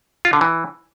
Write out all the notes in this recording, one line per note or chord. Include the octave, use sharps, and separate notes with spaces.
F4
D3
E3